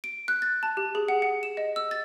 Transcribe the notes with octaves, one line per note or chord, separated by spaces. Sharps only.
D7
F#6
A6
A5
G4
G#4
F#5
F#5
E7
D#5
E6
A6